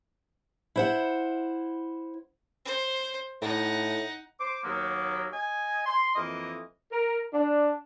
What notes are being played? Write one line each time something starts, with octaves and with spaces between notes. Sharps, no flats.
E4 C5 F#5
C5
A2 D#4 F#5
C5 D6
D#2 F#3 A#3 B3
D#5 G#5
C6
F2 E3 A#3 D#5
A#4
D4